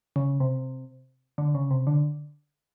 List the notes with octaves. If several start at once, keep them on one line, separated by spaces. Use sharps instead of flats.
C#3
C3
D3
C#3
C3
D3